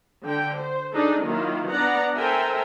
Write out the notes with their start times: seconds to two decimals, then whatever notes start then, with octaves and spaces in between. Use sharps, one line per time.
0.25 D3 G5
0.58 C5
0.94 D4 D#4 G#4 A4
1.25 D#3 F#3 A#3 E4 F4
1.70 B3 D4 D5 F#5 A#5
2.15 A4 A#4 C5 E5 G5 G#5